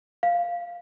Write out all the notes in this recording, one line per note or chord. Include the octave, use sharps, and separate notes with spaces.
F5